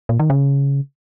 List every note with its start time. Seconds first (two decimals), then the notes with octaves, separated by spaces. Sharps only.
0.09 A#2
0.19 D#3
0.30 C#3